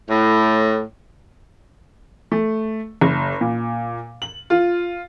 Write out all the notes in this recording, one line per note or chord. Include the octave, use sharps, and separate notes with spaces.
A2
A3
F#1
A#2
F#7
F4